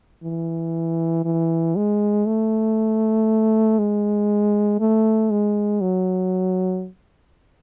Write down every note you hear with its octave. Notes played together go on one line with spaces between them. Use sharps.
E3
E3
G#3
A3
G#3
A3
G#3
F#3